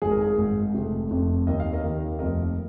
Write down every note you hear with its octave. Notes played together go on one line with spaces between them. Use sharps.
G#1 G#2 G#3 G#4
A#4
G#4
G#1 G#2 G#3
F1 F2 C3
F1 F2 C3
D#2 D#3 A#3 D#5
F5
A#4 D#5
D#2 D#3 A#3
F1 F2 F3 A#3 A#4 D#5